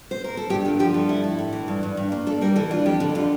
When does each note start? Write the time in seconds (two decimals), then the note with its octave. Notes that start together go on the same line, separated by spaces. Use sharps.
0.11 C5
0.24 A#4
0.37 A4
0.50 G2 G4
0.65 D3 F4
0.79 F3 G4
0.94 G2 A4
1.09 E4
1.24 E4
1.39 A2
1.53 E3
1.68 G2
1.83 G2
1.97 G2
2.12 A#3
2.27 D4 A4
2.41 G3 A#4
2.56 E3 A4
2.71 D4 F4
2.86 F2 G4
3.00 D3
3.15 D3 F4